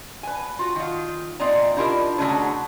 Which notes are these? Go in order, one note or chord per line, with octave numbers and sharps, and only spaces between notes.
B4 G#5
F4 F#4
D#3 F4
A#2 C4 D#4 D5 D#5 A#5
D4 E4 F4 G4 A#4 D#5
D3 F#3 G#3 A3 B3 C#4